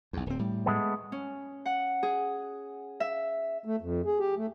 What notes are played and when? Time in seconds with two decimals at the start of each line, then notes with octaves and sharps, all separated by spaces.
0.13 B1 E2
0.26 D1 C4
0.39 A2 G3
0.66 G#3 A3 B3
1.12 C#4
1.66 F#5
2.03 G#4
3.00 E5
3.65 A3
3.81 F2
4.06 G#4
4.20 G4
4.37 A3